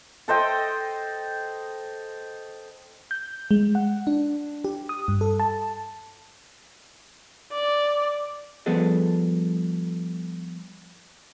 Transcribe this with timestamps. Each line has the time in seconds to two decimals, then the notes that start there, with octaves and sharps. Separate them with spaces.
0.28 A4 C5 D#5 G5
3.11 G6
3.51 G#3
3.75 F#5
4.07 D4
4.65 G4
4.89 D#6
5.08 G2
5.21 A4
5.40 A5
7.53 D5
8.66 F3 G3 B3 G#4 A4 D#5